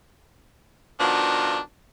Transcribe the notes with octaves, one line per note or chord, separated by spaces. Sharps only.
B2 D#3 F3 D4 F4 F#4